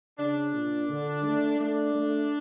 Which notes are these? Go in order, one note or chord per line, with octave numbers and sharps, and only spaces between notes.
C#3 D4
A#2
D3
A3
A3 D4
A3